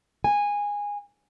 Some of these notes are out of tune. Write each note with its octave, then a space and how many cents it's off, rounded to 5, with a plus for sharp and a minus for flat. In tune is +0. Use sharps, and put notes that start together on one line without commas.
G#5 -15